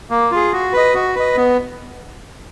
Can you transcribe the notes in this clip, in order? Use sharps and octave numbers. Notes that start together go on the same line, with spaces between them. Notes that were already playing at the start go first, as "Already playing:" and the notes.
A#3
F4 G#4
F#4
B4 D#5
F#4
B4 D#5
B3